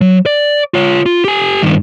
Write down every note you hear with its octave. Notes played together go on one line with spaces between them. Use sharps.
F#3
D5
F4 C#5
F4
G4 G#5
G2 D#3